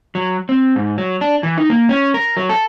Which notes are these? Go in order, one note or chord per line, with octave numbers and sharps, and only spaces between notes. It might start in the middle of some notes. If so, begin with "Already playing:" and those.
F#3
C4
G#2
F#3
D4
E3
D#4
A#3
C#4
A#4
F#3
A4